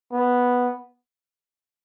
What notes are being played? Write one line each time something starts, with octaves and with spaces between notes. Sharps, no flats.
B3